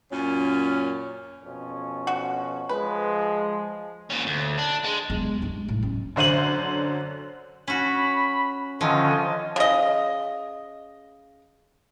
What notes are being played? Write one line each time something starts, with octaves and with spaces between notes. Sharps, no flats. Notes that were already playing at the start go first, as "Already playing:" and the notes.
F#2 A#2 C#4
F2 B2 C#4
F#4
F3 G#3 B4
A#2 C#4
D2
D4
G#3
E2 G#3
G#3 A3
A2
C#4
F#2 D3 C5 D#7 F#7
C#4 F#4 B5
D3 D#3 F3 C#4 D#5
C#3 D#5